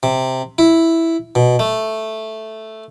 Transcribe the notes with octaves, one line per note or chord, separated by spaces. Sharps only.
C3
E4
B2
A3